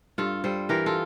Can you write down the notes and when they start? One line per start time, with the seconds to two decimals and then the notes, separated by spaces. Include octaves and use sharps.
0.18 G2 F4 A4
0.44 G3 A4 C5
0.69 E3 G4 A#4
0.86 F4 A4